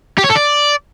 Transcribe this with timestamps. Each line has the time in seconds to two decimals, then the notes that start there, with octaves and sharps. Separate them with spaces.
0.18 G4
0.24 C#5
0.30 A4
0.36 D5